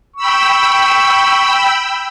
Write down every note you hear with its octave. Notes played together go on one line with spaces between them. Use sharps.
G5 B5 C#6 E6